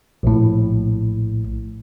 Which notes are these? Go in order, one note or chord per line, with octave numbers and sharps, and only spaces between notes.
A#1 A2